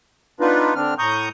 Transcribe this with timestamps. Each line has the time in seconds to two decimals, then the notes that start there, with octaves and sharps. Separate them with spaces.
0.40 B3 D4 D#4 F4 B4
0.75 D3 C4 D4 F6
0.98 A2 A#5 C#6 D#6 G6